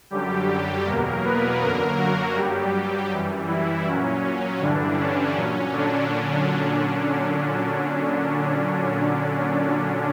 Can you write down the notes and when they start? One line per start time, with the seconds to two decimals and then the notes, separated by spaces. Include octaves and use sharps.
0.10 F#2 D3 F#3 G3 G4
0.85 E2 B2 F#3 A#3 A#4
1.23 B3 B4
1.61 F#2 D3 F#3 A#3 A#4
1.98 F#3 F#4
2.35 G2 F#3 G3 G4
3.11 F#2 E3 G3
3.47 E3 E4
3.85 A#2 F#3 C#4
4.60 G2 D3 E3 G3 D4
4.97 C#4
5.35 A#2 F#3 C#4
5.72 D3 D4